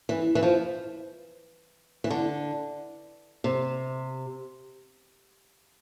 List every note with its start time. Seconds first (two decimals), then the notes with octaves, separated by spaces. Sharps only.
0.09 E3
0.35 E3
0.43 F3
2.04 E3
2.10 D3
3.44 C3